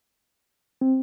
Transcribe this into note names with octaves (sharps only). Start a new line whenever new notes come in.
C4